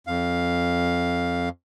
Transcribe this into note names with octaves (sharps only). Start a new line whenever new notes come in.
F2 F5